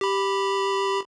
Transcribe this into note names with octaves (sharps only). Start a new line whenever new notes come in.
G4 B5